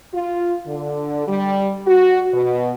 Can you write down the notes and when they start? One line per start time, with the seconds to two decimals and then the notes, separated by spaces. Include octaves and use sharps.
0.14 F4
0.66 D3
1.28 G3
1.87 F#4
2.34 B2